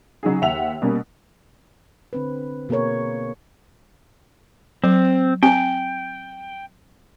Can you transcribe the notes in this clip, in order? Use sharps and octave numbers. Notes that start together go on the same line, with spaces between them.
C#3 F#3 D#4 G#4
D#2 E5 F#5 E6 F7
B2 G3 A#3 C#4
D3 C4 B4
B2 A#3 G#4 A#4 C#5
F#3 C4
C4 G5 G#5